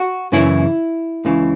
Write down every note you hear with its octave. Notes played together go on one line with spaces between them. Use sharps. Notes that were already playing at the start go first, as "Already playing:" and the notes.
Already playing: F#4
F#2 C#3 E3 E4
C#2 C#3 E3